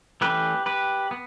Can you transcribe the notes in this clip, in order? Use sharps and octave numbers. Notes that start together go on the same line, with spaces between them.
E3 A3 C#4 G4 B4
G4 B4
B3